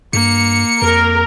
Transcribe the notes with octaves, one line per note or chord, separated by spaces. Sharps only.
G2 A#3 C#7
F2 A#4